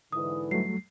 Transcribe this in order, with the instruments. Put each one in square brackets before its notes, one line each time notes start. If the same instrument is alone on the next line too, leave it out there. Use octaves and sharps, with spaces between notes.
[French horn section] G#2 D3 E3 [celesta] D#6
[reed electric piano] F#3 G3 A3 [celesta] C7